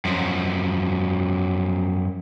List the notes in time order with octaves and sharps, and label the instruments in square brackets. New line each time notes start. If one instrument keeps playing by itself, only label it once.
[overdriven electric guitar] F#2 F3